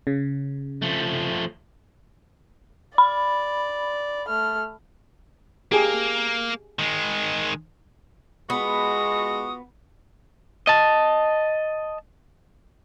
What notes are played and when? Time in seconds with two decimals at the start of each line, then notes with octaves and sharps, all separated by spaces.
0.07 C#3
0.82 F3 A3
2.98 D5 B5
4.27 A3 F6
5.72 A#3 G4 G#4
6.79 D#3 G#3
8.50 G#3 B3 F4 F#4 D#6
10.67 D#5 A5